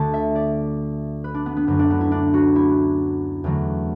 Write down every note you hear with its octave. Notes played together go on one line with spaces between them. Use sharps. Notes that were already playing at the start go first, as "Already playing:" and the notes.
Already playing: D2 D3 A3 A5
E5
D5
B4
D4
B3
B3
F#2 D3 F#3 A3 B3
D4
B3
E4
D4
F#4
E4
E2 D3 F#3 A3